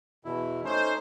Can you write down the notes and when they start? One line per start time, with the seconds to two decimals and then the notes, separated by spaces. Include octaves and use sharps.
0.25 E2 B2 E4
0.64 A3 C#4 D#4 C5